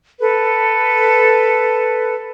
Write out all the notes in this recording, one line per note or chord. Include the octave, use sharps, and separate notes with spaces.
A4 B4